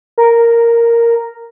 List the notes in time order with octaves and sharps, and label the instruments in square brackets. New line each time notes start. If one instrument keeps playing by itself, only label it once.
[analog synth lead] A#4